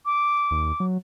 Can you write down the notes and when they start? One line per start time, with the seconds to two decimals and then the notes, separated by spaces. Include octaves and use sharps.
0.06 D6
0.51 D#2
0.80 F#3